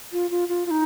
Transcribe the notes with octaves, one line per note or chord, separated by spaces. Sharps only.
F4
F4
F4
F4
D#4